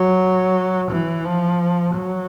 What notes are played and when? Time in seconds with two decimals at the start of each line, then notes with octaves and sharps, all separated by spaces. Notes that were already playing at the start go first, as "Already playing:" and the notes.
Already playing: F#3
0.91 E3
1.25 F3
1.94 F#3